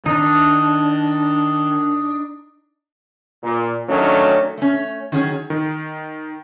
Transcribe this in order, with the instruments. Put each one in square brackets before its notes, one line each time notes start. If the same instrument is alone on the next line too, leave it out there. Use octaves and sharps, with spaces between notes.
[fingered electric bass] D#3 [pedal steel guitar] D4 D#4
[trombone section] A#2
D#3 F#3 A3 C#4 D4
[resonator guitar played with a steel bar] A3 C#4
D#3 F#3 C#4 G#4
[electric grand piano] D#3